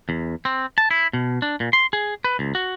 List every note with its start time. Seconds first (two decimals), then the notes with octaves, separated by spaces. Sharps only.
0.09 E2
0.45 C4
0.78 A5
0.91 E4
1.13 B2
1.42 D4
1.60 A#2
1.73 C6
1.93 G#4
2.24 B4
2.39 C#2
2.55 F#4